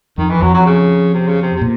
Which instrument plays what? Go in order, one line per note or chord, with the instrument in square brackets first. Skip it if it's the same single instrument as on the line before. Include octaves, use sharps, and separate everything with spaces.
[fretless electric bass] F2 [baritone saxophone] D#3
[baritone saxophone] E3
[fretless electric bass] F2 [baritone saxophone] F#3
[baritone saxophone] F#3
C#3
C3
C#3
C3
C3
[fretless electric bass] A#2